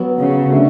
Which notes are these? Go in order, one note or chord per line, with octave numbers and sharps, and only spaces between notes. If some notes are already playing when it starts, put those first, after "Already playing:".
Already playing: F#3 B3 F#4
C#3
D3 A3 D4 F#4